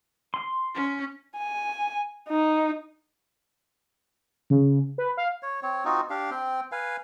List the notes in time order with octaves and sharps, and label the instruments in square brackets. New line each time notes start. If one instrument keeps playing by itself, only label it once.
[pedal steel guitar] C6
[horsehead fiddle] C#4
[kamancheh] G#5
D#4
[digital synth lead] C#3
B4
F5
[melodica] C#5
C4 C#5
C4 D#4 F4 F#4
D4 G4 F5
C4 G5
B4 F5 G#5